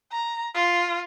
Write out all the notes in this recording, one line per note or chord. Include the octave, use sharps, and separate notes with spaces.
A#5
F4